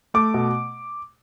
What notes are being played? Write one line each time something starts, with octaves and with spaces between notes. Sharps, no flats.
A3 D6
B2